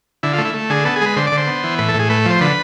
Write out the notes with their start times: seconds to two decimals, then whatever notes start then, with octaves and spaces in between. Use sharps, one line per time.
0.23 D3 E4
0.33 F4
0.38 A3
0.45 E4
0.54 A3
0.70 D3 G#4
0.85 B3 A4
0.96 G#4
1.01 G#3 B4
1.17 D3 C5
1.27 D5
1.32 D3
1.37 C5
1.47 B3
1.64 E3
1.78 A2 B4
1.89 A4
1.94 A2
1.99 G#4
2.10 A3 B4
2.26 F3 C5
2.41 D3 B4